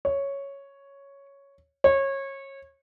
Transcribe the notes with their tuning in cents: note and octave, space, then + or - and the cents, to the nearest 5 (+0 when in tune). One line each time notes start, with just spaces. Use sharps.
C#5 +0
C#5 -25